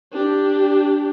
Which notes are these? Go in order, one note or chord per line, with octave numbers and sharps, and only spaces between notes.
D4 G4